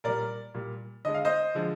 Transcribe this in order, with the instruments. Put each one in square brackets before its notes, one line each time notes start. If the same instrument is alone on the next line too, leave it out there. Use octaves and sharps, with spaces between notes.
[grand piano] A#2 G3 A#4 D5
A#2 G3
D3 G#3 D#5
F5
C5 D#5
D3 F3 G#3